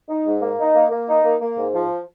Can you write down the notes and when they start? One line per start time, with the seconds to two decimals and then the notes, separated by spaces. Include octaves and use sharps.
0.09 D#4
0.26 G#2
0.42 A#3
0.59 D#4
0.75 A#3
0.91 A#3
1.09 D#4
1.25 A#3
1.41 A#3
1.58 G#2
1.74 F3